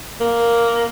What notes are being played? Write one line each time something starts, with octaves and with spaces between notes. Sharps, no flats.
A#3